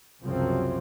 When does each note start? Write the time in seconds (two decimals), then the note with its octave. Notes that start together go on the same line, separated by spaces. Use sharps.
0.22 C2 F#2 C#3 F3 F#3 C4